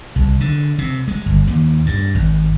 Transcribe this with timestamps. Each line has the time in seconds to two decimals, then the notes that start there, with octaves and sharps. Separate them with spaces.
0.16 C2
0.40 D3
0.78 C3
1.08 G#3
1.26 G1
1.47 D#2
1.86 G2
2.15 G#1